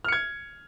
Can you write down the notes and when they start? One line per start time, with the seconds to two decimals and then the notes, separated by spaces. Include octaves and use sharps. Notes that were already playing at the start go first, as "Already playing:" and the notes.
0.05 F6
0.08 C#7
0.12 G#6